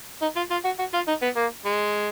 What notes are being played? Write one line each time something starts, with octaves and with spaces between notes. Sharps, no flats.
D#4
F4
F4
F#4
F#4
F4
D#4
B3
A#3
G#3